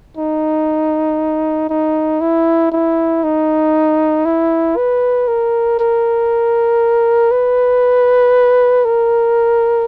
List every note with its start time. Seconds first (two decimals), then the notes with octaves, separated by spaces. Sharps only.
0.17 D#4
1.70 D#4
2.21 E4
2.72 E4
3.24 D#4
4.25 E4
4.77 B4
5.28 A#4
5.79 A#4
7.32 B4
8.85 A#4